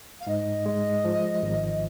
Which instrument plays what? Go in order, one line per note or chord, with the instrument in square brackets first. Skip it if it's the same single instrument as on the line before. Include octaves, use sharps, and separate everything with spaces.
[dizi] F5
[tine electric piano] G#2 [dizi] D#5
[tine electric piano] G#3
F3
G#1